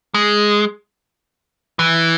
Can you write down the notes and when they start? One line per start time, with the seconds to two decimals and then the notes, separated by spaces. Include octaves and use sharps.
0.14 G#3
1.79 E3